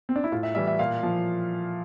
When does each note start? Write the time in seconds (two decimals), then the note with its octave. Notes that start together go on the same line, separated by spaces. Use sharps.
0.09 C4
0.16 D4
0.24 E4
0.32 A2 F4
0.43 E5
0.55 E3 G3 E5
0.67 E5
0.79 A#2 F5
1.03 F3